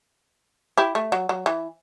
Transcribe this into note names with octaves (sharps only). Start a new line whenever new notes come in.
E4 G4
A3
F#3
F#3
E3